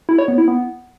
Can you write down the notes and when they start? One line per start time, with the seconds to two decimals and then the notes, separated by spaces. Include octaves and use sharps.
0.09 E4
0.18 C#5
0.28 B3
0.38 E4
0.48 B3